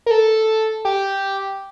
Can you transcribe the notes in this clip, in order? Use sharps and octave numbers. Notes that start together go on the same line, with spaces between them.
A#4
A4
G4